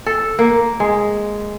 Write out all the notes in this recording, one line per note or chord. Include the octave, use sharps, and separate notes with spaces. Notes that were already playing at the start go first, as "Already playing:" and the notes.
A4
A#3
G#3